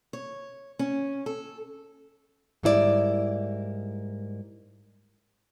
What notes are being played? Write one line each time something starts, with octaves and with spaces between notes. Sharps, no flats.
C#5
C#4
A4
G#2 G3 A#3 E4 G#4 D5